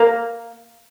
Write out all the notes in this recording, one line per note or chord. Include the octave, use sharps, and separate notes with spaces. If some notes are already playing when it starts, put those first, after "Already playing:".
Already playing: A#3